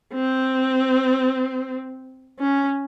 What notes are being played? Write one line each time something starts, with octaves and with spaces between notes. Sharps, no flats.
C4
C#4